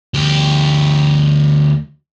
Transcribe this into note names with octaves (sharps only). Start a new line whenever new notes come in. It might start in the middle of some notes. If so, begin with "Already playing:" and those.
D2 G4